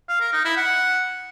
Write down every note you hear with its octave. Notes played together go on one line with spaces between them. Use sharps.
F5
A#4
D#4
E4
F#5